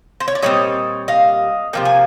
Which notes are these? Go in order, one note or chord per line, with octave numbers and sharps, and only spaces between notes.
C5
C#5
D5
A#2 G3 C4 C#5 D#5
D#5 F5
C3 F3 A#3 G5
G#5